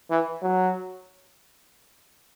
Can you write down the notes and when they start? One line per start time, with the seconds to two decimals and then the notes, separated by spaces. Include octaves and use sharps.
0.10 E3
0.42 F#3